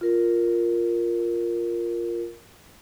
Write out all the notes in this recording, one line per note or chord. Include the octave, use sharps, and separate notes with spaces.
F4 A#4